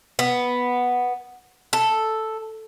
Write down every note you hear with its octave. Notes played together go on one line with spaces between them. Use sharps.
B3
A4